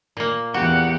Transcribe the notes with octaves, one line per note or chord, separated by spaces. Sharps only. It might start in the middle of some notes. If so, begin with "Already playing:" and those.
A#2 A#3
E2 F#4 G4 F#5